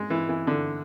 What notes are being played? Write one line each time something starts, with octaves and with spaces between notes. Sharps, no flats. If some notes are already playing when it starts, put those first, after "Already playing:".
Already playing: G#3
E3
E3
D3